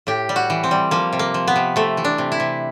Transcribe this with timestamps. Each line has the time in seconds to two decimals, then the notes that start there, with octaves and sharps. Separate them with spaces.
0.07 A2 G4
0.29 G3
0.36 F#4
0.50 E3
0.64 C4
0.71 G3
0.91 F3 A#3
1.13 C3
1.19 A#3
1.34 F3
1.48 B3
1.56 C3
1.76 C3 A3
1.97 E3
2.04 D4
2.18 C3
2.32 E4
2.40 C3